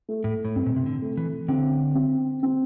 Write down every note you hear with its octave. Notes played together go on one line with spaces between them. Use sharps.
A3
A2
A2
G2 C4
A#2
C3
D3
A3
E3
D3 C4
C4
C4